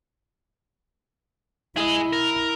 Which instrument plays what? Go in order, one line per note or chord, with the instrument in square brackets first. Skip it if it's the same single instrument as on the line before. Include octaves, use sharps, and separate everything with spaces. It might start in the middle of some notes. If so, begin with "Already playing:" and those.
[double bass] E4 [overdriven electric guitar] G#4 D#5
[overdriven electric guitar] A#4